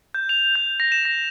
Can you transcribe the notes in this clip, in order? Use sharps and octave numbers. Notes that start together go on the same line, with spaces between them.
G6
F7
G6
A#6
E7
A#6